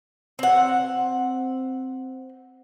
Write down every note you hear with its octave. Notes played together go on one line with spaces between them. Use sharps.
C4 F#5